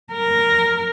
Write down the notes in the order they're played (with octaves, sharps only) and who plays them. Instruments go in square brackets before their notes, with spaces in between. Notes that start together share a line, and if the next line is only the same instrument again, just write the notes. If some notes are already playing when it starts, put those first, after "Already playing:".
[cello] A#4